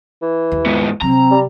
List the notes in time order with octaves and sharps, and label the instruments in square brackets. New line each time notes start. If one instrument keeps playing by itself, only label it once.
[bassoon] E3
[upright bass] D#2
[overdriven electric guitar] G#2 B3
[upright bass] C3 F#3 [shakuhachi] C4 [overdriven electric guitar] A#5
[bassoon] G3